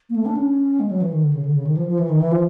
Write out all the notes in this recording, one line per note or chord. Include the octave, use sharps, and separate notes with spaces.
A#3
A3
D4
C#4
G#3
F#3
E3
D#3
D3
C#3
D3
C#3
D#3
F3
F3
E3
D#3
E3
F3